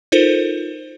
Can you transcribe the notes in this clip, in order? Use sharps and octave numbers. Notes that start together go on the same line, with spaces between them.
D#4 F4 A4 A#4 C5